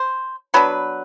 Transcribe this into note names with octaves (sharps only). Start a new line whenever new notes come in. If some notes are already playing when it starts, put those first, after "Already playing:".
Already playing: C5
F#3 B3 D4 B4